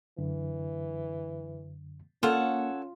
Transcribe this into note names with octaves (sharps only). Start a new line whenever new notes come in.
F#2 D3 E3
A#3 C#4 F4 A4 C#5 F#5